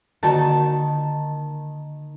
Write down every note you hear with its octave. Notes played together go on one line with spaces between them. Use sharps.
D3 D#3 A#3 D#4 F#4 A5